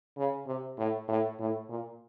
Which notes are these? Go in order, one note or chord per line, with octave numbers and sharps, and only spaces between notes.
C#3
C3
A2
A2
A2
A#2